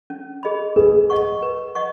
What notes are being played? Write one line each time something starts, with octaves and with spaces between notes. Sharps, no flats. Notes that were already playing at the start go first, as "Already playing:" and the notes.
C#4
G#4 D#5 B5
G#4 B4
D#5 F#5 C#6
B4
D#5 F#5 C#6